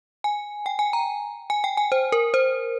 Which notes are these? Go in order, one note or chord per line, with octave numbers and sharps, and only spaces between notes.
G#5
G5
G#5
A#5
G#5
G5
G#5
C5
A#4
C5